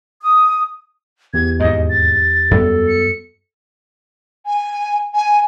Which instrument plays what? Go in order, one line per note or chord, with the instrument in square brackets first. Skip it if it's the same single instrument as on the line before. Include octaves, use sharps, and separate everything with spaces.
[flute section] D#6
[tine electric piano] E2 G4 [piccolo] G#6
[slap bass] D#2 G#2 [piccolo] D#5
[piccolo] A6
[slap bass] F#2 G3 B3 [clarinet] A4
[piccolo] C#7
[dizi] G#5
G#5